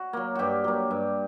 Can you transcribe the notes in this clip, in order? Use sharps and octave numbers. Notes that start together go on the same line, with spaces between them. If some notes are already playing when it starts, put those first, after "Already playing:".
Already playing: F#4
F#3 A#3
G2 F#4 G4
F#3 A#3
G2